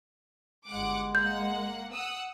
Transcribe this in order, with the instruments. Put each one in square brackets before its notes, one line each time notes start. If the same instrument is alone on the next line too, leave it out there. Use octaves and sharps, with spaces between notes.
[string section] G1 F#5 D6 [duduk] G#3
[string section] A#3 F#5 [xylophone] G6
[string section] F#5 D#6 E6